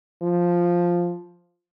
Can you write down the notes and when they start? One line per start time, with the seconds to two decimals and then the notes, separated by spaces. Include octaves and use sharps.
0.23 F3